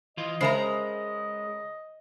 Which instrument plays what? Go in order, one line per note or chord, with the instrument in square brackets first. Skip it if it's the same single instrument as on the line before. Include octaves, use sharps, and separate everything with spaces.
[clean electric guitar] E3 F4 [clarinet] D#5
[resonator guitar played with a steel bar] C#3 A#4 A#5 [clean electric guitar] G#3 [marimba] C5 E5